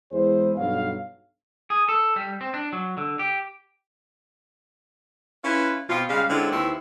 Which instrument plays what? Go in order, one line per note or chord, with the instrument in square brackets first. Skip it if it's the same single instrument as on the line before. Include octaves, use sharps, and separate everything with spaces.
[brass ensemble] E2 G#3 E4 G#4 C5
B1 G2 F#3 B3 F5
[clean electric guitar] G#4
A4
G3
C4
D4
F#3
D3
G4
[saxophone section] C#4 E4 F4 B4
B2 F3 C4 F4
C#3 G3 G#3 F5
D3 G#3 C4 C#4 E4 F4
D#2 F3 C4 E4 B4